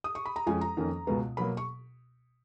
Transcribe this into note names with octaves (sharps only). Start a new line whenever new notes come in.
D#6
C#6
B5
A#5
F2 F3 G#3 C#4 G#5
A#5
F2 D#3 A#3 C#4
C#2 B2 G#3 B3
B2 F#3 A#3 B5
C#6